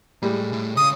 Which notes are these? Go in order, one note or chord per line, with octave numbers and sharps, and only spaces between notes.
A2 G3 G#3
A2
C#2 C#3 D#6